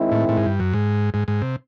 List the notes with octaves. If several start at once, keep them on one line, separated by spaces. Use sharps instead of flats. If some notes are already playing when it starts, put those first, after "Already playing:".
Already playing: D#3 G#3 C4 E4
A2
A2
G#2
G2
F#2
G#2
G#2
G#2
C3